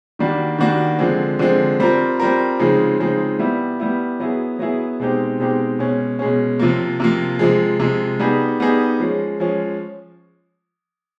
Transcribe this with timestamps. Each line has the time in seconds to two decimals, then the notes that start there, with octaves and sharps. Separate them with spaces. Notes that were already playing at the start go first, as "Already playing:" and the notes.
0.19 D#3 G3 A#3 D4 F#4
0.59 D#3 G3 A#3 D4 F#4
0.99 D3 F3 G#3 C4
1.39 D3 F3 G#3 C4
1.80 G3 C4 F4 A#4
2.20 G3 C4 F4 A#4
2.59 C#3 F3 G#3 C4 D#4
2.99 C#3 F3 G#3 C4 D#4
3.39 G3 B3 E4
3.80 G3 B3 E4
4.20 F#3 B3 E4 G#4
4.59 F#3 B3 E4 G#4
5.00 B2 G#3 C4 D#4 G4
5.39 B2 G#3 C4 D#4 G4
5.79 B2 G#3 C#4
6.19 B2 G#3 C#4
6.59 C3 F3 A#3
7.00 C3 F3 A#3
7.39 C3 F3 G#3
7.80 C3 F3 G#3
8.19 G3 B3 D#4 G#4
8.60 G3 B3 D#4 G#4
9.00 F3 G#3 C#4
9.40 F3 G#3 C#4